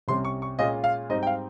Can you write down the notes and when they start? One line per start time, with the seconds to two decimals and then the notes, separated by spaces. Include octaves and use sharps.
0.08 C2 C3 G3 C#4 C6
0.25 C#6
0.42 C#6
0.59 A#2 G#3 C#4 F4 D#5
0.84 F5
1.09 G#2 G3 C4 D#4 D#5
1.23 G5
1.27 F5